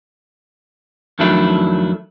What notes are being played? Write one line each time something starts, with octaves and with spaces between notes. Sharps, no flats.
F2 D#3 F#3 A3 D4 E4